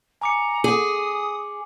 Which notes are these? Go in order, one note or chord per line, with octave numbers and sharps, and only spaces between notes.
G#5 A#5 D6 C#7
G#4 D6 D#6 F#7